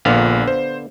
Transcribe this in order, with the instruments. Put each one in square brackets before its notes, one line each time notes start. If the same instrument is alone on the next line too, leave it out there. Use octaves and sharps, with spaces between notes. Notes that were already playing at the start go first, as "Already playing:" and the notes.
[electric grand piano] A#1 A#2 [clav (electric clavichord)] D3 B3 F5
[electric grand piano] C5